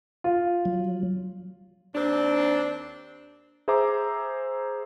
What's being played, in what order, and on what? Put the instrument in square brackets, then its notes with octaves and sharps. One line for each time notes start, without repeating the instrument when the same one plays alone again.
[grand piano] F4
[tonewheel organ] F#3
[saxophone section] D#2 C4 D4
[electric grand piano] G#4 C5 E5 A#5 D6